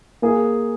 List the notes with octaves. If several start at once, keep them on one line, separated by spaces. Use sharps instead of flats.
A#3 G#4